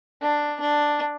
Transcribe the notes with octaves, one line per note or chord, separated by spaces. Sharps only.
D4
D4